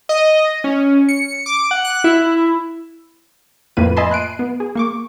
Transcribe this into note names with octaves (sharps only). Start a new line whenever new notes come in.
D#5
C#4
C#7
D6
F#5
F#6
E4
F2 A2 A#3 F4 B4 D#7
D#5 E5 G#5 A5 B5 C6
F#6 C7 D7 D#7
B3
G#4
A#3 C#6 D6